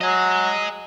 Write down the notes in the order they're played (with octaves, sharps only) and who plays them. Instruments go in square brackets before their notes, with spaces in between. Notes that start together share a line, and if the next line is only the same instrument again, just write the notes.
[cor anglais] F#3 [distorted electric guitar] D#5 G#5